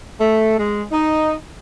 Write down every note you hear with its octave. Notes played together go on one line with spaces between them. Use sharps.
A3
G#3
D#4